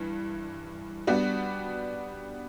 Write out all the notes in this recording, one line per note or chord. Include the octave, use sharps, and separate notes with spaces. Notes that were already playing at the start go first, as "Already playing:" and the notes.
Already playing: G2 E3
G3 B3 D4 F#4